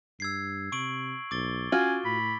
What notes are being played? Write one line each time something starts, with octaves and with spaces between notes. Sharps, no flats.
G2 E6 G#6 C7
C3 C#6 D7 F#7
B1 D6 A6 G7
C#4 F4 F#4 G#5
A2 B5